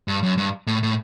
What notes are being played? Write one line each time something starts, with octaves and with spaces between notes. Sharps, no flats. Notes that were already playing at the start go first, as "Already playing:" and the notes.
G2
F#2
G2
A2
A2